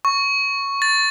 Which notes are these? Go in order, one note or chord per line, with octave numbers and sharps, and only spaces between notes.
C#6
A6